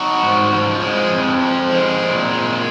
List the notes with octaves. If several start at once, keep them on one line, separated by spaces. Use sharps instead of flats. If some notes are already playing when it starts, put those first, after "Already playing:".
Already playing: D#4 F#4
G#2
F3
G#3
F2
F3
G#3
A#2
G#3